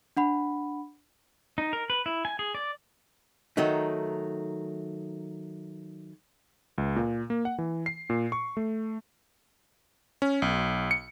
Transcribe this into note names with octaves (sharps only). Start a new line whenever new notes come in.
D4 F#5 B5
D#4
A#4
B4
E4
G#5
G#4
D5
D#3 F#3 A3 D#4
C#2
A#2
A#3
F#5
E3
C7
A#2
C#6
A3
C#4
B1
C#7